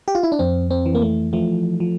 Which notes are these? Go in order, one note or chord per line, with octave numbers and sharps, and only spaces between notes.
G4
F4
E4
D4
F2 C4
C4
E3
A#3
A3
F3 A3
F3